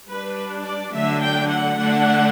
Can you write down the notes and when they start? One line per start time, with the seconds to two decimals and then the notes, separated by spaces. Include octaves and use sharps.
0.08 G3 D4 B4
0.65 D5
0.93 D3 F#3 A3 D4 E5
1.22 G5
1.50 F#5
1.78 D3 A3 D4